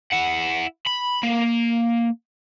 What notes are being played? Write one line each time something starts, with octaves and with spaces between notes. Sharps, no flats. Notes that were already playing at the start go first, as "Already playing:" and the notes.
E4 F#5
B5
A#3